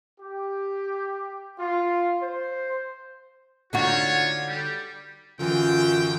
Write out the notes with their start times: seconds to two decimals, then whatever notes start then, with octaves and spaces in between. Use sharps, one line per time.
0.20 G4
1.58 F4
2.21 C5
3.73 D3 D#4 F4 F#4 C#5
4.47 G3
5.39 F#2 D3 E3 F4 G5